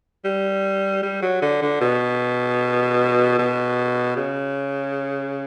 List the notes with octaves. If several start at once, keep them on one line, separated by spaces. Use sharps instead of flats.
G3
G3
F#3
D3
D3
B2
B2
C#3